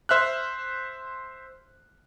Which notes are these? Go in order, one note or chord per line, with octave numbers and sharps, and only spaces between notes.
C5 E5 F6 F#6